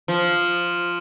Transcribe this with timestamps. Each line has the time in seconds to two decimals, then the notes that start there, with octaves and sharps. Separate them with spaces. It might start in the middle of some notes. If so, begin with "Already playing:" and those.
0.08 F3